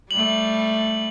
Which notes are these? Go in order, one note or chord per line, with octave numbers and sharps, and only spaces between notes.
G3 A3 F#7